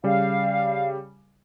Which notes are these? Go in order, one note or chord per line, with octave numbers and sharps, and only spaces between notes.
C#3 G3 F5